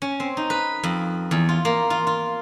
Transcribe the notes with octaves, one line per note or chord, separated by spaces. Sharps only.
C#4
C4
D#4
B4
F2
E2
F4
A#3
F4
F4